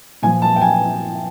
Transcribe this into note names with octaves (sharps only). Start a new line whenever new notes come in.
A#2 F3 G#5
A5
G5
G#5